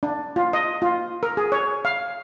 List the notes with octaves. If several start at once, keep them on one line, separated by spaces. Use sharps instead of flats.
D4
F4
D#5
F4
A#4
G#4
C#5
F5